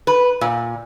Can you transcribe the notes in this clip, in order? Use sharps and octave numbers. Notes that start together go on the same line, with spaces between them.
B4
A#2